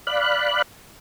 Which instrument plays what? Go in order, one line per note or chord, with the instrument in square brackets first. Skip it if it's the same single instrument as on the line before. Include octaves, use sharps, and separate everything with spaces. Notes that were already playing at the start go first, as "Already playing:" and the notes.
[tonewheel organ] D5 F5 B5 F#6